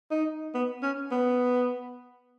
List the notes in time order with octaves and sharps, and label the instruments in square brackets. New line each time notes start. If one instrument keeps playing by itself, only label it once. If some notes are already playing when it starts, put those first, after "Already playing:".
[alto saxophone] D#4
B3
C#4
B3